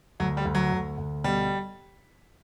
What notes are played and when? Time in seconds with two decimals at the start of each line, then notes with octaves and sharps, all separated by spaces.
0.20 D2 F#3
0.37 G3
0.45 D2
0.55 F#3
0.72 D2
0.98 D2
1.24 B2 G3